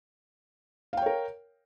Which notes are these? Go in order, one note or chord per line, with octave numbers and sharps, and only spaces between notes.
A#4 C#5 F5 G5